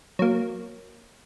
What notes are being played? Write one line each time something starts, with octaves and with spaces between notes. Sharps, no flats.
F#3 A#3